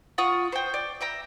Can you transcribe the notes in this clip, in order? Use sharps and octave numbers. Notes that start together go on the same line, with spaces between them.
F4 F#5 C#6 D#6
C5 G5
D5
E5 G5 A#5